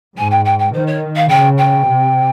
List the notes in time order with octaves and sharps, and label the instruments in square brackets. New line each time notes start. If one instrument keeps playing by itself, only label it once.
[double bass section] G#2 [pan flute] G#5
[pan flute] G5
G5
G5
[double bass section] D#3 [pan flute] C5
[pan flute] C#5
F5
[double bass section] C#3 [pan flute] G5
[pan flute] G5
[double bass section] C3